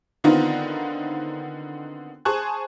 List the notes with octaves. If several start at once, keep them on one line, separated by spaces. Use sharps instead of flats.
D3 D#3 B3 C4 D#4 F4
G#4 C5 G#5 A5 C#6 F#6